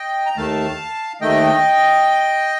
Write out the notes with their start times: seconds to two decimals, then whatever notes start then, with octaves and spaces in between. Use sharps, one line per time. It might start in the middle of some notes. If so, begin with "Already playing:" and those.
Already playing: D#5 G5
0.26 A#5
0.37 D#2 D#3 A3 F5 A5
1.21 D#2 D#3 A3 D#5 G5